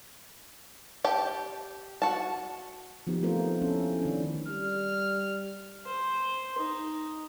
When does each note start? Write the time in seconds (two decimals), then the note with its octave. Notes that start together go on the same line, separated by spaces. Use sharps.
1.04 G4 G5 A5
2.02 F#4 A5
3.07 F3 B3 D#4 G4
3.22 A3 C4 F4 A4 A#4 C5
3.62 C#4 E4 A4
4.02 D#3 D4
4.48 G3 F6
5.86 C5
6.58 D#4